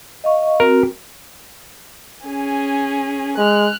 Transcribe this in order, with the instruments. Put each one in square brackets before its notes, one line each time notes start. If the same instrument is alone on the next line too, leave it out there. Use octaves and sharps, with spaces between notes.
[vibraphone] D#5 F5 C#6
[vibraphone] C4 F#4 [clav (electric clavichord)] A#4
[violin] C#4 G#4
[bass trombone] G#3 [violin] F6 F#6